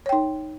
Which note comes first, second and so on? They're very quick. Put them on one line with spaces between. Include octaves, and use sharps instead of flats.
C#5 G5 D#4